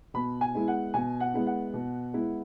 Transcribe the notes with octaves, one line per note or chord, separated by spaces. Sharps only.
B2 B5
G#5
G#3 B3 E4
F#5
B2 G#5
F#5
G#3 B3 E4
F#5
B2
G#3 B3 E4